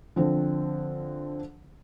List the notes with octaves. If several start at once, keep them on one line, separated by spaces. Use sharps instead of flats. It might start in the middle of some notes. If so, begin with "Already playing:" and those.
D3 F3 C4